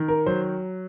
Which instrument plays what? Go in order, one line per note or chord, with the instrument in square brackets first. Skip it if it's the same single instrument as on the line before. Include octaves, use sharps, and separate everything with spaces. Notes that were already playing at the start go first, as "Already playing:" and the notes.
Already playing: [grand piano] D#3
A#4
F#3 C5